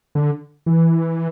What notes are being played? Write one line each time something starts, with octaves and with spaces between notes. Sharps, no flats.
D3
E3